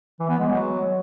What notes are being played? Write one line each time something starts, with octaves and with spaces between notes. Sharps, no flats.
E3
B3
G#3
F#3